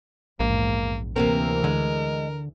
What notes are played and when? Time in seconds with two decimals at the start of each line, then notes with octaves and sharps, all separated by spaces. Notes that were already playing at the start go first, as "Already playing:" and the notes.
0.40 A#1 E2 G#2 A#3
1.16 D2 C3 E3 A#3 C4 A#4
1.64 D3 G#3